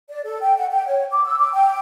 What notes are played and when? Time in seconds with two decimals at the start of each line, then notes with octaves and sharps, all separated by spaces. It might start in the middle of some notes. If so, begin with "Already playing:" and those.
0.09 D5
0.24 A4
0.41 G5
0.57 F#5
0.71 G5
0.86 C#5
1.12 D6
1.24 E6
1.39 D6
1.53 G5